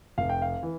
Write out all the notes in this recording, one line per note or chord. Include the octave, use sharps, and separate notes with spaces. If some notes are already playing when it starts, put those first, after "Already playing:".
F1 F5
G5
F5
E3